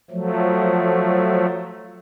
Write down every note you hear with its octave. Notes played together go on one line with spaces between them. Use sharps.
F3 F#3 A3